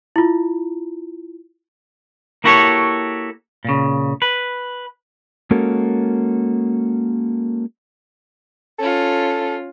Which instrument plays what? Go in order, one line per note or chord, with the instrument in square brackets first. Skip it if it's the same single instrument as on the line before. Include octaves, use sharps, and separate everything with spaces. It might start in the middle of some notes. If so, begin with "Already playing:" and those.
[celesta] E4 F4
[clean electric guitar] A#3 E4 F#4 G4 A4 C#5
A#2 C#3
B4
[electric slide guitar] G#3 A#3 C#4 F#4 A4 A#4
[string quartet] C#4 F4 [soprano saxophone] A4